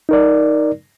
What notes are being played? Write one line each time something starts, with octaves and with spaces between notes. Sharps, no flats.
D#4 A#4 D5